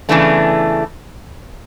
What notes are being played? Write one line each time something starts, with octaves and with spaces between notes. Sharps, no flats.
E2 C#3 E3 A3 D4